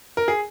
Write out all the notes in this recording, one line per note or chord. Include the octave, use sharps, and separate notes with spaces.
A#4
G#4